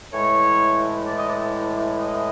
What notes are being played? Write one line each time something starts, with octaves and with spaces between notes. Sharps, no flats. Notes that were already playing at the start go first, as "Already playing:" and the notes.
A2 E3 G#3 C#5
D5
D#5
D5
D#5